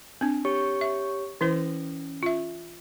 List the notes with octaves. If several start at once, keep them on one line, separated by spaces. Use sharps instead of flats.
C4 D4
G4 C#5 C#6
E5
E3 C#4 E4 C5
F4 E5